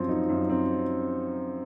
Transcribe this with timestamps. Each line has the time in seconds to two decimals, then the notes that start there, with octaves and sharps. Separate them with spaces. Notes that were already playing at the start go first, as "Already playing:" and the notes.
Already playing: F#2 F3 C4
0.09 D#4
0.29 F#2
0.49 C4